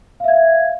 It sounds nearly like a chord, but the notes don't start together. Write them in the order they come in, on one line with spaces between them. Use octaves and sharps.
F5 E5 G#6